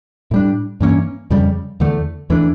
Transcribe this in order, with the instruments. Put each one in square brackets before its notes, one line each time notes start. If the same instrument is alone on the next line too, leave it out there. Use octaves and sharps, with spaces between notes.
[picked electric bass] A2 G3 D4
G2 E3 A#3 C#4
F2 C#3 G3
E2 D3 A3
E2 E3 A3 D4